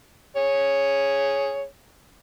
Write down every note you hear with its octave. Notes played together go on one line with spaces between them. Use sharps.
G#4 C#5